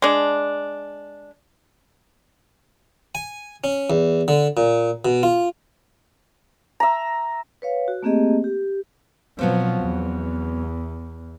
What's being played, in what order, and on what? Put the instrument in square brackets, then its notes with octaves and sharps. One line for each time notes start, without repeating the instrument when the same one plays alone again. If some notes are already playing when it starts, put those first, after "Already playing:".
[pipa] G#3 D4
[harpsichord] G#5
C#4
E2
D3
A#2
B2
F4
[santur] E5 A#5
[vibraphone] B4 C#5 F5
F#4
A3 A#3 C4 G4 G#4 D#5
G4
[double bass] B2 F3 [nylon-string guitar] F#3 B3 C4
[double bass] E2